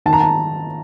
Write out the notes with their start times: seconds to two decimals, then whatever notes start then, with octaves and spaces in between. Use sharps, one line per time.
0.06 D#3 A5
0.13 A#5
0.20 A5